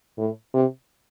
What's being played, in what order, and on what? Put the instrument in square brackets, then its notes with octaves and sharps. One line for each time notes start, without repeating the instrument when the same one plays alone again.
[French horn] A2
C3